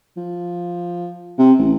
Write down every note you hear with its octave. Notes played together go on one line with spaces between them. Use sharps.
F3
C3
A1